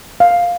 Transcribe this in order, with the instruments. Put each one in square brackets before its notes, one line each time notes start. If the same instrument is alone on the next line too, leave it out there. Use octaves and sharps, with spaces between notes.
[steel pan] F5